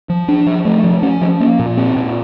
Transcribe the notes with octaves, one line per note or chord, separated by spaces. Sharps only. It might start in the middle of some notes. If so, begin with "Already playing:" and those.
F3
D4
F3
A3
F3
C#4
F3
A#3
A#2
C4
A#2